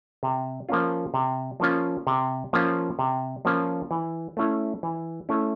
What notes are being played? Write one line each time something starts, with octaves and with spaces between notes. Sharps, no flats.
C3
F3 A#3 C#4 F4
C3
F3 A#3 C#4 F4
C3
F3 A#3 C#4 F4
C3
F3 A#3 C#4 F4
E3
A3 C#4 E4
E3
A3 C#4 E4